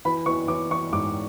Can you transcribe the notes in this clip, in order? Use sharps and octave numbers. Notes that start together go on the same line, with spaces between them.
E3 B5
E3 C#6
E3 D6
E3 C#6
G#2 D6